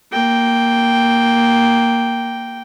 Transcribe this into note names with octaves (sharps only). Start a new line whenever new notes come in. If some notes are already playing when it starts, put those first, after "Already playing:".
A#3 G5